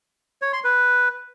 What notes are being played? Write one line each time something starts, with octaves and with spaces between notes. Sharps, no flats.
C#5
C6
B4